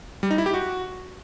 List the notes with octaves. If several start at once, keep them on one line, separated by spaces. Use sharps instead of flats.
G3
D#4
E4
G4
F#4